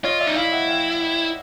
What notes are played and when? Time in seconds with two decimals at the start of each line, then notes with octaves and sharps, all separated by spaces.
0.04 F4 C#5 D#5
0.20 D5 E5
0.27 D#4
0.36 E4 D#5 F5
0.52 E5 F#5
0.69 F5 G5